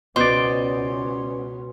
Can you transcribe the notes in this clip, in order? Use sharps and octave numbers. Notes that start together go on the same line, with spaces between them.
C#2 B2 B3 C#4 C5 D5 C6